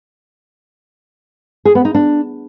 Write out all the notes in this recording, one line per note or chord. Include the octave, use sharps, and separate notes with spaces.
G#4
B3
D#4
D4